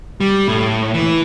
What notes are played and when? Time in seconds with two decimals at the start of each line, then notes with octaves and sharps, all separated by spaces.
0.20 G3
0.48 A2
0.94 E3